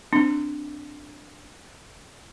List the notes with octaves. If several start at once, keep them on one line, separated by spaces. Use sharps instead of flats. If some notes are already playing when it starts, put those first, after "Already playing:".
C4 D4